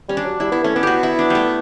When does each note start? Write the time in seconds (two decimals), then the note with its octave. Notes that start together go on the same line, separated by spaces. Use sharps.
0.09 G3 C#4
0.17 D4
0.25 F#3
0.40 G3 E4
0.52 B3 E4
0.64 A3 C#4
0.75 B3 D4
0.83 F#4 G4
1.03 E4
1.19 D4
1.30 G3 A3